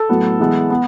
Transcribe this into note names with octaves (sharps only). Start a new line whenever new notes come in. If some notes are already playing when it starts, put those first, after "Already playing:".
Already playing: A4 A5
A2 F#3 B3
E3 G#3 B3
B3